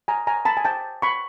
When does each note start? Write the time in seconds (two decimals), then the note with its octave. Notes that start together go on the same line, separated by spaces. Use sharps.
0.08 G#5 A#5
0.27 G#5 A#5
0.45 A5 B5
0.57 G#5
0.65 G5 A5
1.02 B5 C#6